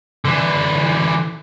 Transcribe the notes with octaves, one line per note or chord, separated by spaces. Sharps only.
D3 E3